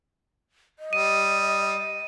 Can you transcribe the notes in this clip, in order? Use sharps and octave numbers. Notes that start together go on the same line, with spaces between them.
D#5
G3 D#6 D#7